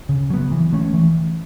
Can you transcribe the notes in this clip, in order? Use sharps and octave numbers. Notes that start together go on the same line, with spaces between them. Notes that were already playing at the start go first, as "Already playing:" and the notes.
C#3
F#3 B3
E3
A3 C#4
E3